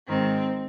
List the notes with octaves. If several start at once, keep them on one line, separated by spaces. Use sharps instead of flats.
G#2 D#3 C4